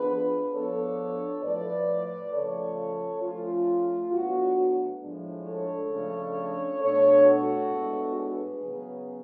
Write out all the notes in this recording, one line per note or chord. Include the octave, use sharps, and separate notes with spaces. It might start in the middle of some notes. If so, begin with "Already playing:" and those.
Already playing: F3 B3 D4 G#4 B4
F3 B3 D4 A4 C#5
A2 F3 A3 B4 D5
C#3 F3 A3 A4 C#5
F3 A3 C#4 F4
A2 F#3 B3 D4 F#4
A2 F3 G#3 D4
A4 C#5
C#3 F3 A3 D4
B2 A3 D4 A4 C#5
F#4 A4
A2 G#3 B3 D4
G#4 B4
C#3 F#3 B3